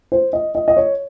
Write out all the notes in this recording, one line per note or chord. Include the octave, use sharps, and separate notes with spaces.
C5
D#5
D#5
D#5
C#5